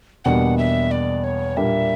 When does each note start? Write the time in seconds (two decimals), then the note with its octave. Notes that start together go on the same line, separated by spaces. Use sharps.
0.25 E2 B2 G3 A#3 D4 F#5
0.58 E5
0.91 D5
1.24 C#5
1.57 A#2 G3 A#3 D4 E5